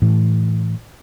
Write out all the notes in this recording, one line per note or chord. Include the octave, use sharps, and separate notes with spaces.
A2 E3